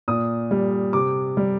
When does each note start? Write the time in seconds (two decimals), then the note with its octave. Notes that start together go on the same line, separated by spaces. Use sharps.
0.08 A#2 D#6
0.51 G3
0.93 C3 D6
1.37 G3